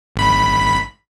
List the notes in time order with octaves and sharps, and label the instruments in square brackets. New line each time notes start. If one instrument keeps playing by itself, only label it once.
[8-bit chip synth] G#1 B5